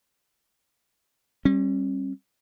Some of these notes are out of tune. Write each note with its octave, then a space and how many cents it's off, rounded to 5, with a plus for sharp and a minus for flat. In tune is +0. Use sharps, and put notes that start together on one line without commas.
G3 +0 C#4 -40